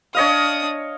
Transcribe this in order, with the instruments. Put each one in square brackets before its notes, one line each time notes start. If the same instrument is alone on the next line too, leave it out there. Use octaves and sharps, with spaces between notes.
[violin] D4 D#6 [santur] C#5 D#5 F5